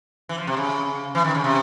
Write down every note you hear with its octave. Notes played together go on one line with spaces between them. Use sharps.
E3
F3
C3
C#3
E3
D#3
C#3
C3